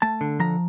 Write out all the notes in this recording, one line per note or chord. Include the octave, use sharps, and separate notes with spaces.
A3 A5
D3
F3 A#5